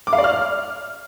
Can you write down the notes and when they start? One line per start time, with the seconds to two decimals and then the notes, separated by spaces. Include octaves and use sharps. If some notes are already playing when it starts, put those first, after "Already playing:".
0.07 D6
0.13 F5
0.18 D5
0.24 F6